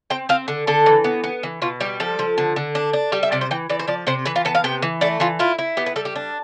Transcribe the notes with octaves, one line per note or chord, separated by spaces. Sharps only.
C4 G5
C4 F5
D3
D3 A4
E3
B3
B3
E3
B2 F4
G3 G4
F3 A4
F3
D3
D3
D4
D4
G3 G4
E5
C3 D5
C5
E3 G5
E3 D5
C5
F3 D5
C3 C5
E3 B4
F4
B3 A4
F5
C3 G5
E3
A3 D5
E3 F4
E4 F4
E4
B3 G4
B4
G3 A4
G4
D4